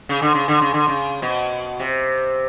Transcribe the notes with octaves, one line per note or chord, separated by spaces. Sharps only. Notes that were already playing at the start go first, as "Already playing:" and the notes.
C#3
D3
C#3
D3
C#3
D3
C#3
B2
C3